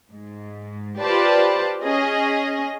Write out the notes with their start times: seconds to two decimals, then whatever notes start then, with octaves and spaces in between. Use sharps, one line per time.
0.11 G#2
1.01 F4 G4 B4 C5 D5 A5
1.81 C#4 G#4 D#5